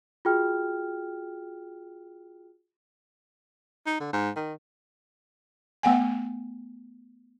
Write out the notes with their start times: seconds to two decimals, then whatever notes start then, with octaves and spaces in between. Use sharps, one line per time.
0.25 F4 F#4 G#4 G5 F6
3.86 D#4
4.00 D3
4.13 G#2
4.36 D#3
5.83 A3 B3 F#5 G#5